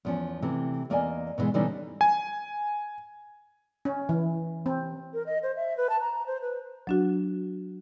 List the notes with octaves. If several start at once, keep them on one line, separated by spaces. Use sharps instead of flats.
E2 F3 C#4
C3 E3 A3
E2 A#3 D5 D#5 G#5
B2 D3 E3 G#3
B2 D3 E3 G3 C#4 D#4
G#5
C#4
E3
C4
A#4
D#5
C5
E5
B4
A5
A#5
C5
B4
F#3 D4 F#4